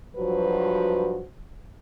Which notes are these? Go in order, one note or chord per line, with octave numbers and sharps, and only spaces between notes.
G2 F3 F#3 F#4 B4 C5